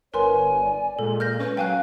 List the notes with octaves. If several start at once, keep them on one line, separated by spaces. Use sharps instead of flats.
G1 A#4 B4 C#5 G#5 C6
D5
A#2 G#3 A4
F6 G6 A#6
C#4 B4
F#3 C#4 F5 G5 G#5 F#6